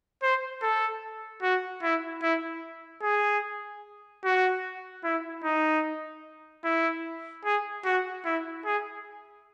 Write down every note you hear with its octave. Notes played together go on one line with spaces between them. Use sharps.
C5
A4
F#4
E4
E4
G#4
F#4
E4
D#4
E4
G#4
F#4
E4
G#4